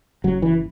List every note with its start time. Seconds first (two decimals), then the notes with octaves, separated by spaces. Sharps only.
0.24 F#1 F#3
0.42 E3